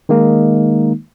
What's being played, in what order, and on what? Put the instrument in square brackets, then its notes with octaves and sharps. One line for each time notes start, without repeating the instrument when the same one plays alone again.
[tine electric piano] D#3 G#3 A#3 D#4